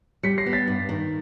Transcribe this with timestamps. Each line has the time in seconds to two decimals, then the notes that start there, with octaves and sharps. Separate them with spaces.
0.23 G3 B6 C#7
0.38 A#6 C7
0.46 B3
0.53 A6 B6
0.68 G2
0.89 D#3